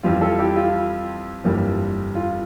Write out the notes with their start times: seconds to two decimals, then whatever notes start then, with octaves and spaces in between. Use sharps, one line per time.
0.03 F2 E3 G3 F4
0.21 F4 A4
0.39 E4 G4
0.56 F4
1.44 G1 F2 E3 G3 A#3
2.15 F4